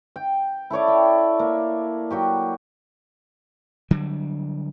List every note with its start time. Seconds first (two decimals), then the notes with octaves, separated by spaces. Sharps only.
0.16 G5
0.70 E4 A4 C#5 D5
0.88 G5
1.39 A#3
2.10 F#3 F#4 G4
3.91 D3 F#3 G3